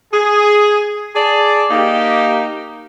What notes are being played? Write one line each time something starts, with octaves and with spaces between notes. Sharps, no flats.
G#4
G#4 D5 A5
A#3 D#4 G4